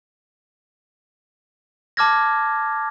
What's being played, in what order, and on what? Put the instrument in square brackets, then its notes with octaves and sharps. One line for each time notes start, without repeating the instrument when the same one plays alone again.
[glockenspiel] A5 D6 F6 G#6 A#6